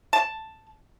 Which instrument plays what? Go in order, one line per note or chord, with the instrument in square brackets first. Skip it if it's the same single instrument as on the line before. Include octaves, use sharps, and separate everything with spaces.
[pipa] A5